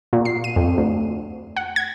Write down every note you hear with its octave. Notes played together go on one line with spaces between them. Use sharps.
A#2
C7
D#7
F2
D2
F#5
G#6